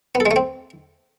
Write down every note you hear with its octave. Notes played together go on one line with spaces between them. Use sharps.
B3
A4
G#3
A3
C4